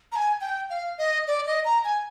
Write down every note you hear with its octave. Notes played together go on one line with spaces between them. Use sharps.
A#5
G#5
G5
F5
D#5
D5
D#5
A#5
G#5